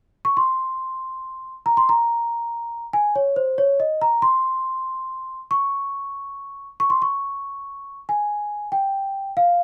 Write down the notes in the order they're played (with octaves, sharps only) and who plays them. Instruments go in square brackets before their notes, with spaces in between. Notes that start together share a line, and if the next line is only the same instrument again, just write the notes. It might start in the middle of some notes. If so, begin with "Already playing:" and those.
[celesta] C#6
C6
A#5
C6
A#5
G#5
C#5
C5
C#5
D#5
A#5
C6
C#6
C#6
C6
C#6
G#5
G5
F5